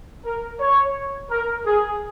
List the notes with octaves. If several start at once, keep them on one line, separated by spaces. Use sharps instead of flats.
A#4
C#5
A#4
G#4